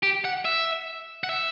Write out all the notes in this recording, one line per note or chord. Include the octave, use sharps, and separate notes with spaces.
G4
F#5
E5
F#5
E5